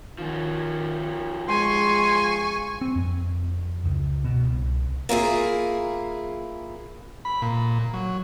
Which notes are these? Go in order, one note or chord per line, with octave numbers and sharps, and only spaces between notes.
D#3 F3 C#4
G#3 G#5 C6 C#6
C4
F2
C#2
B2
C2
A#3 E4 F4 G#4
B5
A#2
F#3